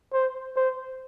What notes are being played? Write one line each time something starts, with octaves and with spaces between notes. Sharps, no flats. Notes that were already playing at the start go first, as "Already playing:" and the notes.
C5
C5